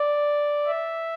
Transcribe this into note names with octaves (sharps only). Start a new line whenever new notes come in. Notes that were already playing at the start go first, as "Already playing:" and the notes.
Already playing: D5
E5